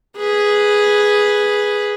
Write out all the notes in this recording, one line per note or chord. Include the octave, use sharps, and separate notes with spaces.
G#4 B4